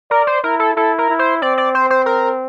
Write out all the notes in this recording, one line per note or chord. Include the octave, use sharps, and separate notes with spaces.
A#4 D5
C5
E4 A#4
A4
E4 A4
A#4
E4
C5
C4 D5
D5
C5
C5
A#4